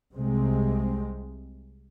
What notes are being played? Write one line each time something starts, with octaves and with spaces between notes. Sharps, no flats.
C2 C3 G#3 C4